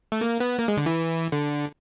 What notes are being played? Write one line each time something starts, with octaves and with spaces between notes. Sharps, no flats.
A3
A#3
B3
A#3
G#3
D3
E3
D3